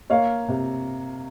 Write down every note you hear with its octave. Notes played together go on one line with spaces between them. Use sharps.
A#3 C#5 F5
C3